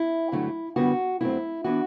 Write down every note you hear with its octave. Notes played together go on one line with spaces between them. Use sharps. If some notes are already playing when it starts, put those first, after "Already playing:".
Already playing: E4
G2 D3 F#3 A3 D4
F#2 D3 G3 B3 E4 F#4
G2 F#3 A3 C4 E4
E3 B3 D4 F#4